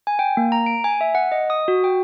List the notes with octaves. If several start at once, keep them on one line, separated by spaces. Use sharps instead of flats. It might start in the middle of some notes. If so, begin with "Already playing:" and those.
G#5
G5
A#3
A#5
D7
G#5
E5
F#5
D#5
D#6
F#4
G5